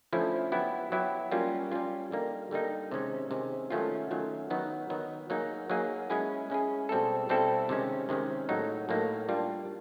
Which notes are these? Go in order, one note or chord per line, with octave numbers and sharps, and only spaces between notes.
D3 F3 A3 C#4 E4
F#3 B3 E4 G4
F#3 B3 E4 G4
G3 A#3 C#4 F4
G3 A#3 C#4 F4
D3 G3 A#3 D#4
D3 G3 A#3 D#4
C3 D#3 G#3 C#4
C3 D#3 G#3 C#4
D#3 F#3 A3 C#4 F4
D#3 F#3 A3 C#4 F4
D#3 F#3 B3 D#4
D#3 F#3 B3 D#4
F#3 A#3 D#4 G#4
F#3 A#3 D#4 G#4
G#3 C#4 E4 G#4
G#3 C#4 E4 G#4
B2 G3 C4 E4 A4
B2 G3 C4 E4 A4
C3 D#3 G#3 C#4
C3 D#3 G#3 C#4
A2 F#3 A#3 D#4
A2 F#3 A#3 D#4
G3 A#3 D4 F4